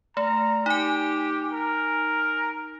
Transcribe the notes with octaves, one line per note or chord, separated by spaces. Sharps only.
A3 A#5
D#4 G4 G#5
A#4